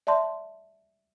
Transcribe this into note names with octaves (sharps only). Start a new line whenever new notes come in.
D5 E5 A5 C6